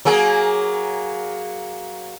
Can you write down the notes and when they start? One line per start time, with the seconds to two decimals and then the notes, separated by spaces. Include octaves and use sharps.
0.05 F#3 A#3 G#4